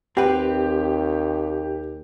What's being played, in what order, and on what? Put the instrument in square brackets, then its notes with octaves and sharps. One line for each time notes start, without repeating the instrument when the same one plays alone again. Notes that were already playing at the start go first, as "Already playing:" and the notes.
[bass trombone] D#2 [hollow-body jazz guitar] C4 B4 [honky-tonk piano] G4